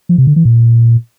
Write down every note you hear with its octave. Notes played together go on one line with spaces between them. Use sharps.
F3
C3
D3
E3
A#2